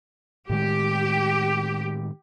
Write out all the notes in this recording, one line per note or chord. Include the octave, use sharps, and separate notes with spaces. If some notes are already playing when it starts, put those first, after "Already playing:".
A2 D#3 G#3 G4